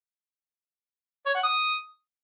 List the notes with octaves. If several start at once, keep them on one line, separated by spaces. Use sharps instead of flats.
C#5
F#5
D#6